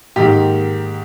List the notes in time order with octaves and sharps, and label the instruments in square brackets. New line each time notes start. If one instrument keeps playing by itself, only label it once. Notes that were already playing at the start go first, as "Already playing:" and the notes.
[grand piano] G#2 D#3 A#3 G4